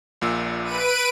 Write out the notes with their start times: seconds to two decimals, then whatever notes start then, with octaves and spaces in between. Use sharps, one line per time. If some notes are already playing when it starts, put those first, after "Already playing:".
0.21 A#1 A#2 E6
0.64 B4 D7 D#7